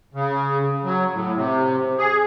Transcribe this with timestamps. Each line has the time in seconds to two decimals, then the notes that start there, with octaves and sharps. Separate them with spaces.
0.14 C#3
0.84 F#3
1.13 A2
1.35 C3
1.98 G#4